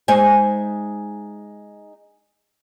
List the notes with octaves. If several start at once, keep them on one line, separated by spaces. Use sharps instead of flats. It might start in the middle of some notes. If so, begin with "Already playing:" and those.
G#3 D#4 C5 E5 G#5